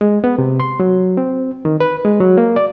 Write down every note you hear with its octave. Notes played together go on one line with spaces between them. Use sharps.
G#3
B3
C3
C6
F#3
C4
D#3
B4
G#3
F#3
A#3
D5